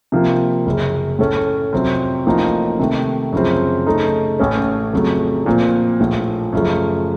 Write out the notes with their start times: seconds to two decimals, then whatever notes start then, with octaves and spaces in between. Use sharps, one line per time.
0.12 C3 F3 A#3
0.66 F#1 F#2 C#3
1.19 A2 A3 C#4 A4
1.73 F2 C3 F#3 C4
2.26 A1 A2 F3 A#3 D#4
2.79 C3 D#3 A3
3.32 F#2 C#3 F3 C4
3.86 C#3 A3 D#4 A4
4.39 A1 A2 A3 C#4
4.93 F2 C#3 F#3 A3
5.46 A#2 F3 C4
6.00 A#1 A2 F3
6.52 F#2 C#3 F3 A3